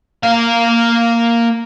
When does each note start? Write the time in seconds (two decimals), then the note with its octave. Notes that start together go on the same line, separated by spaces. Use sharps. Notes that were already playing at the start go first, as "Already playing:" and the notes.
0.23 A#3 F5